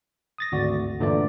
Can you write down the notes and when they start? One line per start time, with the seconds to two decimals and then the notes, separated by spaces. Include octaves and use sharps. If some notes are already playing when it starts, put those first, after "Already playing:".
0.38 D#6 A6 A#6
0.52 G#1 D2 F#4 D5
0.99 G1 A#2 D3 E3 A3 D5